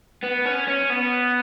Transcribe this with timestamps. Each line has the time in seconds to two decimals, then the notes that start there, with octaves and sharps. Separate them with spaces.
0.24 B3
0.46 C#4
0.68 C#4
0.90 B3